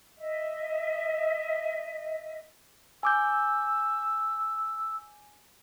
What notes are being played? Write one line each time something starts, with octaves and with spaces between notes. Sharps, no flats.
D#5 E5
G#5 D6 E6 G6